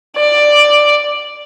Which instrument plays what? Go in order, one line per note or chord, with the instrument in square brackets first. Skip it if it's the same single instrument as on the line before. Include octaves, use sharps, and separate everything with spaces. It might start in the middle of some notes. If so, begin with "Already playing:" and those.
[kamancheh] D5